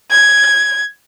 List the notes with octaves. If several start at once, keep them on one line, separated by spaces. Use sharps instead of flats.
G#6